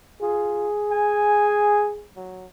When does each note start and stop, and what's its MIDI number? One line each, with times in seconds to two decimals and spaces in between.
0.22 0.68 65
0.22 2.07 68
0.92 1.94 80
2.16 2.46 54